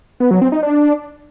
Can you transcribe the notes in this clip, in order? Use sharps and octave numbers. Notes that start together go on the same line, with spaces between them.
B3
F#3
C4
D#4
D4